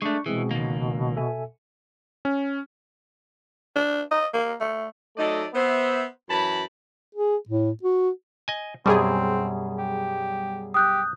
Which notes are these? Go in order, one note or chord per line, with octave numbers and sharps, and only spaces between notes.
G#3 A3 D4 C#6
B2 E3 G#3 C4 G#4
C#2 D#3 A#3
A4 E5 G#5
C#4
D4
D#5
A#3
A3
F#3 A3 D#4 A4 D5 D#5
B3 C5 E5
F#2 E3 A5 B5
G#4
A2
F#4
D#5 G#5
F#2 B2 G3 C4 G#4
G4
G4 D#6 F#6 G6